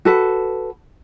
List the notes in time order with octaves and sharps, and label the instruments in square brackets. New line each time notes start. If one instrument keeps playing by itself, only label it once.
[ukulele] F#4 A4 B4